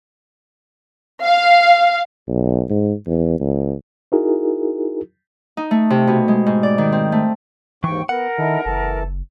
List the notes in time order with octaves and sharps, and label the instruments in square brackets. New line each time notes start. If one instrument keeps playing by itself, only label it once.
[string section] F5
[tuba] B1
G#2
E2
C#2
[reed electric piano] D#4 E4 F#4 G#4 A#4
[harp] D#4
A3
C3
B2
G#3
G#2
D5
D#3
C4
A3
[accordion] D#2 G#2 C#6 [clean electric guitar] E3 [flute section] G5
[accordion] B3 [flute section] A#4 [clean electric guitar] F#5
[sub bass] D#3 [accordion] D#4 E4 A4
[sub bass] F#1 [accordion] E3 A4 A5